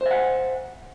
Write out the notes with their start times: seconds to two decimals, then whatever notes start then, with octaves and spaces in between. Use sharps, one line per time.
0.01 C5
0.06 E5
0.11 F#5